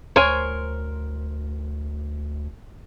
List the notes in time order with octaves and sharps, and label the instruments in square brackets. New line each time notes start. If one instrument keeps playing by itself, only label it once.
[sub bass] D2 [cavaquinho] A#4 [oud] C5 [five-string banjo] C#5 G#5